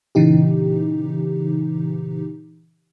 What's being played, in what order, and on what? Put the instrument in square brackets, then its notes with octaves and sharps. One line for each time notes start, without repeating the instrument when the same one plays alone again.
[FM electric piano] A#2 C#3 E3 D#4 G4